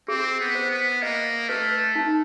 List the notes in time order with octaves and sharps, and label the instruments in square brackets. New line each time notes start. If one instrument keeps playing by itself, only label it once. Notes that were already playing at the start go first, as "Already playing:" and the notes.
[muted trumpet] C4 [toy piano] G#4
[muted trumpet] B3
[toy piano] C5
[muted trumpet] B3
[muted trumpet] A#3 [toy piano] D#5
[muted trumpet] A3 [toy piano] B4
[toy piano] D#4